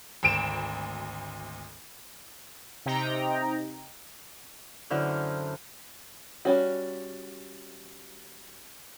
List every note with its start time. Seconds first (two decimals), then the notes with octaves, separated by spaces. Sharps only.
0.23 G#1 D2 D7 E7
2.86 C3 D#4 G5 A#5
4.90 F#2 D3 E4 C5 F6
6.45 G3 C#4 F#4